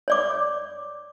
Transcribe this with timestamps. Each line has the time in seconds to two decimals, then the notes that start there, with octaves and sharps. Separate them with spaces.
0.08 C#5 D5 D6